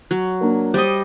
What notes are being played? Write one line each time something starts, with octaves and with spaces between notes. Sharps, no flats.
F#3
A#3 D4
G3 C5 D#5 D#6